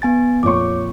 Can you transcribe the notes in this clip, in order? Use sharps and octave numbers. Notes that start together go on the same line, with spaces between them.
B3 G#5 A6
F2 A#2 C#5 C#6 D6